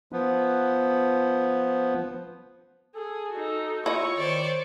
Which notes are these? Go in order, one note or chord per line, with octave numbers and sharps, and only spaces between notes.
F3 B3
G#4 A4
D#4 F#4
E4 F4 C#5 D#5 C#6
D#3 C5 D5